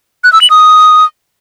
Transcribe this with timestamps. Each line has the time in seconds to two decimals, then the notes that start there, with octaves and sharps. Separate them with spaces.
0.24 F#6
0.33 E6
0.41 F#7
0.50 D#6